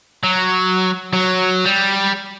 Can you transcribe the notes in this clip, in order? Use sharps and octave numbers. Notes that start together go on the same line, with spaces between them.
F#3
F#3
G3